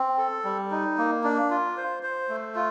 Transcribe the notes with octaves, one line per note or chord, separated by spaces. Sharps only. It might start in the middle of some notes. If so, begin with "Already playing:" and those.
Already playing: C4
A4
G3
D#4
A#3
D4
F4
C5
C5
A3
F4